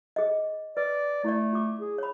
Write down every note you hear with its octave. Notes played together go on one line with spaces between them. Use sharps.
G#4 D#5
B4 D5
A3 E4 D5
F4 D6
G#4
C#5 B5